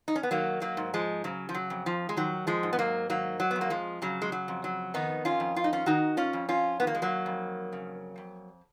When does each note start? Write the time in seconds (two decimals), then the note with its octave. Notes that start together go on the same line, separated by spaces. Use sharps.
0.08 D#4
0.16 C#4
0.23 B3
0.31 D#3 F#3 A#3
0.62 F#3 A#3
0.77 G#2
0.94 F3 G#3
1.24 C#3 F#3
1.49 F3
1.54 F#3
1.70 F2
1.86 F3
2.09 G#3
2.17 D#3 F#3
2.47 F3 G#3
2.63 G#2
2.73 B3
2.79 F#3 A#3
3.09 D#3 F#3 A#3
3.40 F#3
3.51 B3
3.56 F2
3.61 A#3
3.70 F3 G#3
4.02 C#3 F#3
4.22 G#3
4.32 F#3
4.48 F2
4.64 F#3
4.94 D#3 B3 D#4
5.25 C#4 F4
5.40 F2
5.56 F4
5.64 D#4
5.73 C#4 F4
5.86 D#3 D#4 F#4
6.17 C#4 F4
6.33 F2
6.49 C#4 F4
6.80 D#3 B3
6.87 A#3
6.95 G#3
7.02 F#3 A#3
7.26 F2
7.73 C#3
8.18 F2